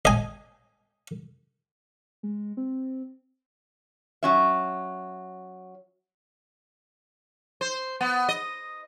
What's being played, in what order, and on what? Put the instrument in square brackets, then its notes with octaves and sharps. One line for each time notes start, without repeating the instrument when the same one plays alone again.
[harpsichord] D#5 G#5
[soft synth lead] G#3
C4
[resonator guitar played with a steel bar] F#3 C#4 E5
[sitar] C5
B3
D#5